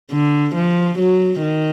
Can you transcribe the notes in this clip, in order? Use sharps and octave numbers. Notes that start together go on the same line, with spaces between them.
D3
F3
F#3
D#3